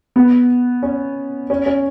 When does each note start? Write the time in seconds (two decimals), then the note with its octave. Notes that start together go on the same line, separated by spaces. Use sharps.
0.16 B3
0.83 C#4
1.50 C#4
1.66 C#4